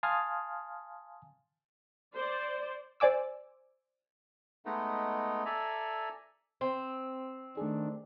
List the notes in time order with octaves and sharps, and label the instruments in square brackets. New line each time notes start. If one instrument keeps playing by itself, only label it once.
[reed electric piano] F5 G#5 A5 C6 D#6 F6
[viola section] C5 D5
[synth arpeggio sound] C5 D5 G#5 D6 E6
[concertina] G#3 A3 B3 D#4
A4 D5 E5 G#5 A#5
[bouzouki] C4
[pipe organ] D#3 D4 [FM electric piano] A3 G#4